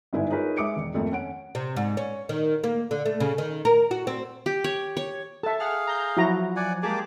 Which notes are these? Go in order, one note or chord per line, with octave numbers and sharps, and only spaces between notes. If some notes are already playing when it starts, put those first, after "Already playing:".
G1 G#2 E4 B4 G#5
D#4 F4 G#4 A#4 B4 C#5
G#3 E5 D6 D#6 C#7 D7
E1
G#1 F2 A3 A#3
C#4 F#5 D7
C3
G#2
C#4
D#3
A#3
D3
A3
C#3
D#3
A#4
F#4
C4
G4
C#5
C#5
A4 E5 A5
G#4 F5 F#5 F6
A#5 G6
F3 F#3 E4 F#4 A#5
D5 F#5 G#5
G#3 A#3 G4 G#4 A5 D6